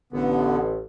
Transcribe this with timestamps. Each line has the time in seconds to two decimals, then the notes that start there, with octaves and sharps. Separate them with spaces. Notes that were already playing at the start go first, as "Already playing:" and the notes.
0.13 A1 D3 B3